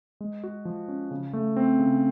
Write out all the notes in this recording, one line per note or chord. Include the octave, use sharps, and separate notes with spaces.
G#3
F#4
F3
C#4
C#3
A3
C4
C#3